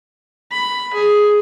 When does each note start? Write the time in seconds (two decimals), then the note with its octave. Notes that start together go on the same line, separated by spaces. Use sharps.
0.52 B5
0.93 G#4